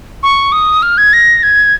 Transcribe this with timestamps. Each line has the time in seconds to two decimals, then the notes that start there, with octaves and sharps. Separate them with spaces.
0.23 C#6
0.52 D#6
0.82 F6
0.98 G#6
1.13 A#6
1.43 G#6